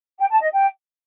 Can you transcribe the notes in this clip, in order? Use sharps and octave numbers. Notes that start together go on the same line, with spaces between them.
G5
A5
D#5
G5